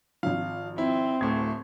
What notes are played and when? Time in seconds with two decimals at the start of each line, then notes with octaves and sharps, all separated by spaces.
0.23 G#1 F3 F5
0.78 C4 E4
1.21 D1 A2 G#6